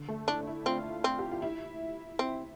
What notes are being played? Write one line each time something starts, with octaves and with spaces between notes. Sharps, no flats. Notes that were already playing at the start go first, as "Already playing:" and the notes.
Already playing: D3
A3
D4 E4
D4
E4
C4 F4
C4
G4
F4
E4
C4